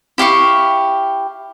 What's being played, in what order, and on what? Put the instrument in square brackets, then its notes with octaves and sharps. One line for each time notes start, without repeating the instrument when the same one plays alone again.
[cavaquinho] E4 G4 F5 C#6